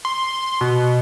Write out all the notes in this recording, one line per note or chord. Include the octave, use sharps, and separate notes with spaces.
C6
B2